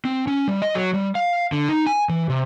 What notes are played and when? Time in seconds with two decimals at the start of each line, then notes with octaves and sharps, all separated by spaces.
0.05 C4
0.27 C#4
0.48 G3
0.62 D#5
0.75 F#3
0.94 G3
1.15 F5
1.52 D3
1.69 D#4
1.87 G#5
2.09 E3
2.30 C3